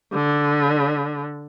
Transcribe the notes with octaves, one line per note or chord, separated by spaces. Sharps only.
D3